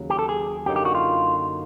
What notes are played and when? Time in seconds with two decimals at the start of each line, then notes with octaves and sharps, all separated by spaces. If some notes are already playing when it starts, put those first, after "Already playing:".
Already playing: D#2 C#3 F#3
0.10 G4
0.19 A4
0.29 G#4
0.66 F#2 D3 F#3 A#3 D#4 G4
0.76 G4
0.85 F#4
0.95 F4